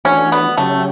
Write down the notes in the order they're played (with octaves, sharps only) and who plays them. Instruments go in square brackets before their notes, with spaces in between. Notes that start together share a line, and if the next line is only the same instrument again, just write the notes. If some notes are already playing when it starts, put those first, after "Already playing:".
[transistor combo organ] E3 A3 D4 F#4 [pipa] C#4
[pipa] B3
[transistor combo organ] C#3 F#3 C#4 G4 [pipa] A3